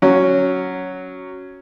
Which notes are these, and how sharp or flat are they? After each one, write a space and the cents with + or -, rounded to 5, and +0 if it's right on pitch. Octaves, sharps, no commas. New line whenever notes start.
F#3 +0 C#4 +0